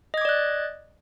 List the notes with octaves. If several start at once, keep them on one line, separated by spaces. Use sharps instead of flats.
D5 D#5 D6 F#6 G#6